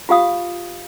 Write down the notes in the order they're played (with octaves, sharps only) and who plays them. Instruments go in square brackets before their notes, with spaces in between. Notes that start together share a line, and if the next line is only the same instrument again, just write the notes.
[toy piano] F4 G4 F5 D#6